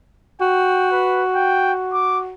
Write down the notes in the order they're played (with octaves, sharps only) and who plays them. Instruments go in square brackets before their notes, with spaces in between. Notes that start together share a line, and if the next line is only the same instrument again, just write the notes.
[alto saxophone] F#4 [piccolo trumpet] G5
[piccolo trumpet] B4
G5
D6